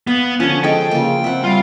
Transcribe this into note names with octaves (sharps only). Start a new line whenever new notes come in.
B3 F5
D3 F3 C#4
G#3 A4 G5
C#3 A#3 F4
C4 E5 F#5
G3 F4